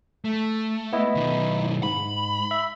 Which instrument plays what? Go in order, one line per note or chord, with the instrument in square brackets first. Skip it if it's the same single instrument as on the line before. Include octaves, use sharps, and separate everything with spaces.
[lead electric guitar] A3
[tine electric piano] B3 E4 D#5
[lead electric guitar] B1 D#3
[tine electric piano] G#2 [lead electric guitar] B5
[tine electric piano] E5